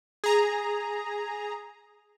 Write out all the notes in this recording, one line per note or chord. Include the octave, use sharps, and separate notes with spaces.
G#4 A#5